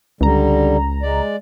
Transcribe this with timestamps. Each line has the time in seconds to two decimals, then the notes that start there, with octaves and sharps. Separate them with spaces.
0.21 C#2 D3 G3 A#5
1.03 G#3 D5